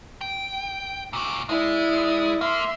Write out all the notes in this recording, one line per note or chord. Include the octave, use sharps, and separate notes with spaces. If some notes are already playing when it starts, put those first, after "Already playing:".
G5
A#2 F#4 D6
G#3 E4 D5
A#3 E5 C6